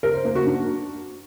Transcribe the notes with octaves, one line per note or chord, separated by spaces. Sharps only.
A#4
C5
A#3
F#4
D4